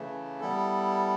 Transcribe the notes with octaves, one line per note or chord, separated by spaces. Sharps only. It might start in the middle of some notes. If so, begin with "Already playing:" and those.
Already playing: C#3 E3 A3
G3 B3 E4 A4